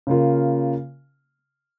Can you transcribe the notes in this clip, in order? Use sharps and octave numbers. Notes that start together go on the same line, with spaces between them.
C#3 A#3 F4